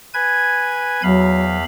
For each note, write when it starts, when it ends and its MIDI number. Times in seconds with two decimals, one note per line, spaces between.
0.14 1.02 71
0.14 1.02 80
0.14 1.02 92
1.03 1.64 40
1.03 1.57 54
1.03 1.64 77
1.03 1.64 83